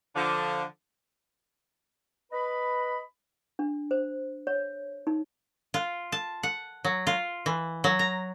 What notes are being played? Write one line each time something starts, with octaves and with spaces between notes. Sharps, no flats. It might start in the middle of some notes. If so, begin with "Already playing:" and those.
D3 F3
B4 D#5 B5
D4
C5
C#5
D#4
F4
A5
F#5
F#3
F4
E3
F#3
A#5